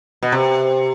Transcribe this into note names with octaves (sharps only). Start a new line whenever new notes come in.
B2
C3